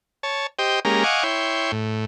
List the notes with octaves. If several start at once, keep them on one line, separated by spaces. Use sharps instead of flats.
C#5 A5
G4 C5 D#5 G5
G#3 A#3 C#4 G4 A#5
D#5 F5 F#5 G#5 C#6 D6
E4 C#5 G5 C6
A2